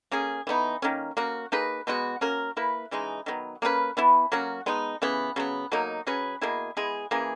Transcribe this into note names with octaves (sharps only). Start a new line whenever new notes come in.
A#3 C#4 G#4
E3 B3 D#4
D#3 A#3 C#4
A#3 C#4 F#4
A#3 D#4 G#4 B4
B2 G#3 B3 F#4
A#3 C#4 F#4 A#4
A#3 E4 B4
C#3 E3 G#3 D#4
D#3 F#3 B3
A#3 C#4 G#4 B4
E3 B3 E4
F#3 A#3 C#4 F#4
G#3 B3 D#4
C#3 E3 B3
C#3 F#3 B3
B2 F#3 A#3 D#4
F#3 C#4 G#4 B4
B2 A#3 E4 G#4
G#3 B3 E4 G#4
E3 A#3 C#4 G#4